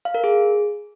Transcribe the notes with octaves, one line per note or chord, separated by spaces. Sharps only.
F5
A#4
G#4